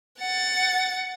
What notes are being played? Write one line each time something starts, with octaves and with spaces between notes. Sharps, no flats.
F#5 A6